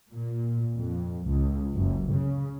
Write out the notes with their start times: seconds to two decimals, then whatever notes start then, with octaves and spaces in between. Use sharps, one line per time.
0.12 A#2
0.76 F2
1.28 C#2
1.75 F#1
2.15 C#3